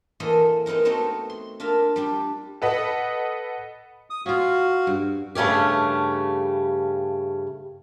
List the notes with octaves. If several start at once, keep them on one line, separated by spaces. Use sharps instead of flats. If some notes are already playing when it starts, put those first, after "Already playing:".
E3 A#3 A4 C5 D#5
G#3 B3 C4 D#4 A#4
A3 B3 C4 D#4 F#4
C6
D4 F4 A#4 E5
G3 D4 G4
A4 B4 D#5 F#5
D#6
C#4 F4 F#4 F5
G2
G2 C#3 A3 C#4 G4